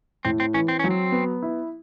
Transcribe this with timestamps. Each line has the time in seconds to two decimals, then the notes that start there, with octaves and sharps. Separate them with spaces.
0.25 A2 C4
0.40 C4
0.54 E3 C#4
0.68 C4
0.79 F#3 C#4
0.90 C4
1.12 B3
1.43 E4